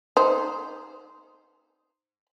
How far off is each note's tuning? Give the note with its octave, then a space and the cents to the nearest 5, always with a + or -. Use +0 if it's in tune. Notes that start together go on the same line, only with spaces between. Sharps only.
D#4 +0 C5 +0